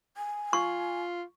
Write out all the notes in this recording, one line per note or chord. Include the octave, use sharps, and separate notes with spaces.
G#5
F4 C#6